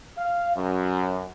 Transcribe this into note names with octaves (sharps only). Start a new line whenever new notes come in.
F5
F#2